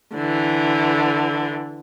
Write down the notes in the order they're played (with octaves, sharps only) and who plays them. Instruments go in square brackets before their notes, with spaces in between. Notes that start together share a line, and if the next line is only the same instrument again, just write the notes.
[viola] D3 E3